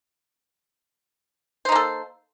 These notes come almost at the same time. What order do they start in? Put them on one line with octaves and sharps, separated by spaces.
C5 D#4 A#3 A4